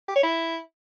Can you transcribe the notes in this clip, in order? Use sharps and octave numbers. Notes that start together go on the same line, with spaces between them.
G4
C#5
E4